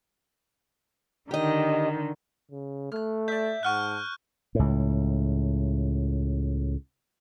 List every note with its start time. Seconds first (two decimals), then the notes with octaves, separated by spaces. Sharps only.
1.31 D3 D#3 G4 D#5
2.51 C#3
2.92 A3 F6 F#6
3.28 D5 E5 G6
3.63 G#2 F#5 A5 C#6 F6 F#6
4.55 C#2 A2